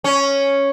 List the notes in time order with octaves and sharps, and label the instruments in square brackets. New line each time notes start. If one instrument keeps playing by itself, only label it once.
[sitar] C#4